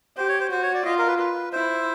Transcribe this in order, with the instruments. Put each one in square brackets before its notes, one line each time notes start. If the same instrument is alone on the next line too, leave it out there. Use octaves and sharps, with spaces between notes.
[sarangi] G4 [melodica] C5
[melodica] C#5
C5
[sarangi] F#4 [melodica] C5
[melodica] C#5
D5
[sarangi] F4 [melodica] D#5
[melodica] A#4
B4
B4
[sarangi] E4 [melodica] C5